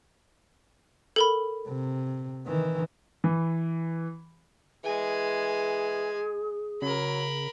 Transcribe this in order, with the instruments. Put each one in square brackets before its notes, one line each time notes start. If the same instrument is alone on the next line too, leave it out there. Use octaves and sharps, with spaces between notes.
[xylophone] A4 A#4 B5
[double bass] C3
D#3 E3
[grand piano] E3
[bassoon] E3 [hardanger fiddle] G#3 G#5 [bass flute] G#4
[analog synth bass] C#3 [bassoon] F#3 [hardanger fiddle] A#4 B5